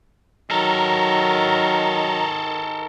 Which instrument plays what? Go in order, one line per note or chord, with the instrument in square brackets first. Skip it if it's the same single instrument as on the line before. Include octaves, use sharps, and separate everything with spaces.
[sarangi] D#3 [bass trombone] F#3 [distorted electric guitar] A4 A#4 [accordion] A#5